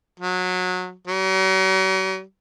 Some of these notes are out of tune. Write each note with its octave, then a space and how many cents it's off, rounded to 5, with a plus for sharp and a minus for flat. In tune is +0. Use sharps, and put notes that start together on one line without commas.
F#3 -20
F#3 +45